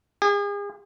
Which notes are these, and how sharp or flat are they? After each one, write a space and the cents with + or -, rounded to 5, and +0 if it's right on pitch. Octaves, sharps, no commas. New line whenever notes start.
G#4 -40